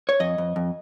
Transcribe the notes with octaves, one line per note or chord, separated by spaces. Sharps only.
C#5
F2 D#5
F2
F2